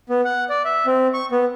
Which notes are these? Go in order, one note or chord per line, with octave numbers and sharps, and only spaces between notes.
B3
F#5
D5
E5
C4
C#6
B3